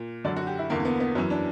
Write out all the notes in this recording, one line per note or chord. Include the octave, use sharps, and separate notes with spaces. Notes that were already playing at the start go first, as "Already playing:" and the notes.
Already playing: A#2
F#2 D3 D5
F#4
G4
E4
E2 D3 A#3
A#3
B3
B3
F#2 E3 C#4
D4